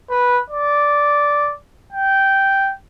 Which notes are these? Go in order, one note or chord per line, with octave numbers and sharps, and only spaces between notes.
B4
D5
G5